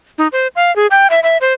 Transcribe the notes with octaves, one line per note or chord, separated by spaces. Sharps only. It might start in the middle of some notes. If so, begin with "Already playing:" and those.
D#4
C5
F5
G#4
G5
E5
E5
C5